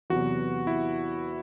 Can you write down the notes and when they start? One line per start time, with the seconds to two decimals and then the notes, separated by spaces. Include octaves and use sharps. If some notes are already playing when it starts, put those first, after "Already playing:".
0.10 E2 C3 F#3 B3 F#4
0.67 E4